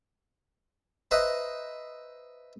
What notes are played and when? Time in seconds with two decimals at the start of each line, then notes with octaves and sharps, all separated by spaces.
1.11 B4 C5 D#5 E5 A#5 B5